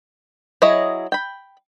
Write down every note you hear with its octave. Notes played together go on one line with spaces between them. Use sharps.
F#3 E4 G#4 C#5 D#5
G5 B5